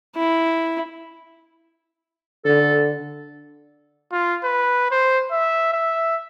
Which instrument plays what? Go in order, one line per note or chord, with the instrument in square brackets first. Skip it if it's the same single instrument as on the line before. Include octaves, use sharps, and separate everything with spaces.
[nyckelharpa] E4
[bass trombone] D3 [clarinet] A4
[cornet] F4
B4
C5
E5
E5